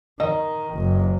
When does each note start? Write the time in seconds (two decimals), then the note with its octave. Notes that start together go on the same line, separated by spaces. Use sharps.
0.20 D#3 D#5
0.75 F#1